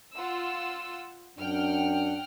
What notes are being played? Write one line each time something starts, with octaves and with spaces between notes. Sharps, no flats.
F4 F#5 E6
F#2 D4 F#5 G5 F6